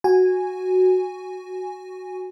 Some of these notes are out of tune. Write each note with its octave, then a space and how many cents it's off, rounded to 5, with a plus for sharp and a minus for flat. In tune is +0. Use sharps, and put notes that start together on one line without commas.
F#4 +0 G#5 -10